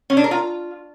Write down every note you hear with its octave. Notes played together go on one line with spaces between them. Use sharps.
C#4
D4
A#4
F4